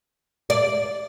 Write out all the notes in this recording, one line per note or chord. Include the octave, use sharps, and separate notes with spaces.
D5